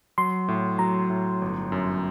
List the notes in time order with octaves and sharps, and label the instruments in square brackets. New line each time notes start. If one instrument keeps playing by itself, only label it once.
[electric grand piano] F#3 [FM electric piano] C6
[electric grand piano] A2
[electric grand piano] F#3 [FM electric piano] A#5
[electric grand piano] A2
G1
F#2